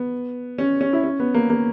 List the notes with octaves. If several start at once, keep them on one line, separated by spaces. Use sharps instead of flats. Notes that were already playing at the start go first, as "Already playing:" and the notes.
Already playing: B3
C#4
C#4
E4
C#4
B3
A#3
A#3